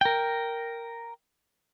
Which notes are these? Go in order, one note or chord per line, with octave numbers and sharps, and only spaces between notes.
A#4 G5